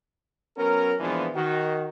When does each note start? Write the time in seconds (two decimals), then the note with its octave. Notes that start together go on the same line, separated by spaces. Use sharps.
0.57 F#3 B3 C#4 A#4
1.00 A#2 E3 F3 G#3 B3 D4
1.35 D#3 F#4